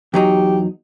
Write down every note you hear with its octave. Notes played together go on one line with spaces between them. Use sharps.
E2 F#3 D#4 G4